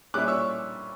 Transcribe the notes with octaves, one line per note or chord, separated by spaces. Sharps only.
A#2 G3 C#4 E4 D6 F#6
C#6 E6